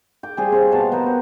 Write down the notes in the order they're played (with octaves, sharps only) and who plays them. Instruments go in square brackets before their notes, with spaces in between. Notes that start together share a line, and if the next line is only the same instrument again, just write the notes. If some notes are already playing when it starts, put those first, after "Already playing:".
[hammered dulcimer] G5 D6
G3 C4 F4 G#4
C4 C5 C#5
B2 B3 F5 A5
B3 A#4 C5
F#4 C5